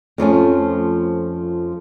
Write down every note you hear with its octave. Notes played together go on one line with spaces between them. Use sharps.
F2 F3 A3 C#4